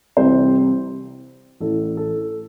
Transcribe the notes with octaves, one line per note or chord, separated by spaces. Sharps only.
C2 C3 E3 G3 C4 C5
A1 A2 E3 A4
A4